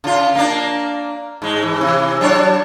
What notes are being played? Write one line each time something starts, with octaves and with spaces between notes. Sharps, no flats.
C#3 F4
A#3 D4
G#2 G#3
G#2 E3
C3 E3
F#3 D4 C#5